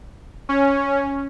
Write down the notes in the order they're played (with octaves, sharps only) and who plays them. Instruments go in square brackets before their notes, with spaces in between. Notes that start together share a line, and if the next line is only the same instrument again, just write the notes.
[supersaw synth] C#4